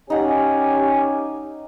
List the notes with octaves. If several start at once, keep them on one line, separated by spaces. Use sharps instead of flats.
C#4 D#4 G4 F#5 G#5